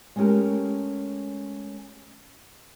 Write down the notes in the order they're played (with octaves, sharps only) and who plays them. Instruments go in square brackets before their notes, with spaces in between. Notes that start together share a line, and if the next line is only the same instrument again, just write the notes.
[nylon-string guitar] G#3 A3 B3 C#4 G4 A#4